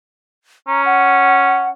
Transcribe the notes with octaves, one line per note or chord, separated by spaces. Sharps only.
C#4 A#5
F#5